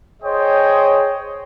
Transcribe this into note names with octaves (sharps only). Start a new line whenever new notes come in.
G#4 C5 C#5 D#5 G5 D#6